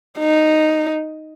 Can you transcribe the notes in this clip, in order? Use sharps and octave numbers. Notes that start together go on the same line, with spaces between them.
D#4